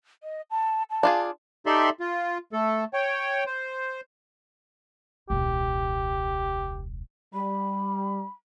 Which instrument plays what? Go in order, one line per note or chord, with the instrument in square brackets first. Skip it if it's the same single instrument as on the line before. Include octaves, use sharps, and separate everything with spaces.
[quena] D#5
A5
A5
[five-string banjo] D4 F4 G#4
[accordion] D#4 G4 A4 D5 E5 C6
F4
A3 A4
C#5 G5
C5
[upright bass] E1 C#2 [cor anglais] G4
[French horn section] G3 [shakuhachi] B5